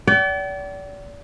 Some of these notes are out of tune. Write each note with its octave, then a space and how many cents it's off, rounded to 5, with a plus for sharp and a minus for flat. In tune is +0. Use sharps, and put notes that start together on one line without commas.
D5 -35 G5 -45